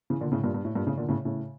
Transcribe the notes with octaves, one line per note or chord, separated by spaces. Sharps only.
C#3 E3
A#2 D3
A2 C#3
G2 A#2
G2
A2
G2 A#2
A2 C#3
A#2 D3
A2 C#3
A2 C#3